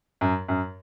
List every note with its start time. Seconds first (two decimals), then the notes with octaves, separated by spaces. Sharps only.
0.21 F#2
0.48 F#2